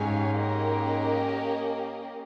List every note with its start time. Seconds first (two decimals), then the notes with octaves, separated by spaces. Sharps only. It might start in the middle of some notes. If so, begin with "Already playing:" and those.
Already playing: G#2 C#4 G4 C#5 F5 G#5
0.38 A#3 C#4 G4 A#4 D#5